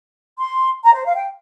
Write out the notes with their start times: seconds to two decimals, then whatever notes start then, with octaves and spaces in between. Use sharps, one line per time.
0.39 C6
0.83 A#5
0.94 C5
1.05 F5
1.16 G5